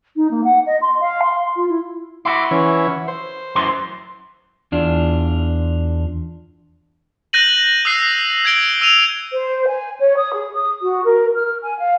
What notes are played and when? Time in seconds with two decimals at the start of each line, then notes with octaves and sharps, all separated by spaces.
0.16 D#4
0.31 A#3
0.44 F#5
0.67 D#5
0.82 C6
1.01 F5
1.23 C6
1.56 F4
1.69 E4
2.25 E4 F#4 C6 D6
2.51 E3 C#4
3.08 C5
3.55 F#2 E3 C6
4.72 E2 D4 F4
7.33 F#6 G6 A#6 D#7 F#7
7.85 D#6 E6 F#6 C7
8.45 G6 G#6 A#6 D7 G7
8.81 E6 D#7 F7
9.32 C5
9.67 G#5
9.99 C#5
10.16 D#6
10.33 G#4
10.53 D#6
10.81 F#4
11.04 A#4
11.35 F6
11.62 G#5
11.79 F5